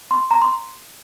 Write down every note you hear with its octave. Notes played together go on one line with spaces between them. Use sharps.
C6
A#5
C6